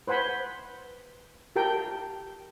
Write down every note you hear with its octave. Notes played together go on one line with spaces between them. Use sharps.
B4 C5 F#5 G#5 B5
G4 A4 A#4 G5